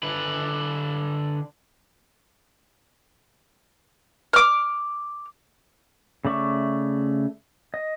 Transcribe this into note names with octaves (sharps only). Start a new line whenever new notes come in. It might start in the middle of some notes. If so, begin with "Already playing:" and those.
D3 B4
D6 F6
C#3 A3 D5 E5 C#6
D#5